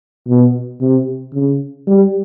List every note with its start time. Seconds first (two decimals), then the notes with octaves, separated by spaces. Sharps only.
0.28 B2
0.81 C3
1.33 C#3
1.87 G3